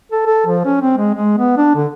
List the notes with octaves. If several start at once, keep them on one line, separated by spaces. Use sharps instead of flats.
A4
A4
F3
C#4
C4
G#3
G#3
B3
D4
D3